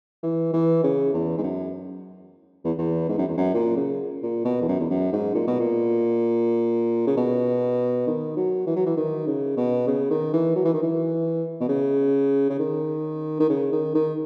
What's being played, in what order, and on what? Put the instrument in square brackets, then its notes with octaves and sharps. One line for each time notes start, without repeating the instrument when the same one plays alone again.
[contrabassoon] E3
E3
C#3
E2
G#2
F#2
E2
E2
G#2
F#2
E2
F#2
A#2
C#3
A#2
B2
E2
F#2
E2
F#2
G#2
A#2
B2
A#2
C#3
B2
D#3
F#3
E3
F#3
E3
D#3
C#3
B2
C#3
D#3
E3
F#3
E3
D#3
E3
B2
C#3
C#3
D#3
D#3
C#3
D#3
D#3